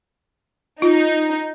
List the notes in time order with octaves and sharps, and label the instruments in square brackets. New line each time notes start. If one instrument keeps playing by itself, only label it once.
[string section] D#4 [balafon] F4